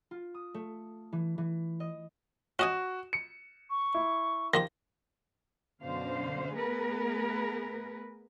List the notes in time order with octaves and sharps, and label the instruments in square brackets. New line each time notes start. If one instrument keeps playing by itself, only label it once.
[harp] F4
D#6
A3
E3
E3
D#5
[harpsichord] C#4 D#5 G#5 [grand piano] F#4
[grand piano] C#7
[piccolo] C#6
[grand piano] E4
[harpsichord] D#3 F3 G4 [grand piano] A#6
[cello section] F#2 B2 D3 C5 F5
A3 B3 G#4 A#4 B4